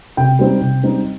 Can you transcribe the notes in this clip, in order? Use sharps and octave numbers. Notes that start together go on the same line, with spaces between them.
C3 G5
G3 C4 D#4
C3
G3 C4 D#4